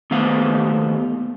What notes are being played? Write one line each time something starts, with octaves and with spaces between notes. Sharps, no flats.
D#2 A3 B3 C5 F5